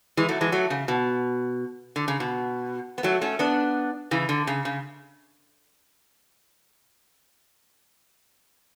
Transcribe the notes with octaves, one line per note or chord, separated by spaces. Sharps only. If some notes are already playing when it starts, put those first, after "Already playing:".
E3 G#3
F#3 A3
E3 G#3
F#3 A3
C#3
B2
D3
C#3
B2
B3
F#3 A3
A3 C#4
B3 D4
C#3 E3
D3
C#3
C#3